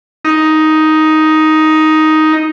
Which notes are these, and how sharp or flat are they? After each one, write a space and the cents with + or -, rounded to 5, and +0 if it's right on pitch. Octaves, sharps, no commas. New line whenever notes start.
D#4 +5